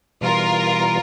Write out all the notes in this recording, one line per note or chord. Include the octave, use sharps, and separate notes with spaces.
B2 E3 G3 F4 A#4